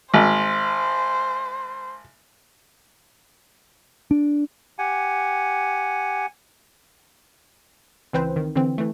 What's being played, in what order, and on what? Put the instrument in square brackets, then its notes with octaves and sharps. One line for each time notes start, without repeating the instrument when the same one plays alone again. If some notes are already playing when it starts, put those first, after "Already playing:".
[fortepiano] G#1 [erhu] C5
[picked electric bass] D4
[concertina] G4 F#5 G#5
[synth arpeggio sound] C#2 E3 C4 B4 C5
D#3
D3 E3 C4
E3 A3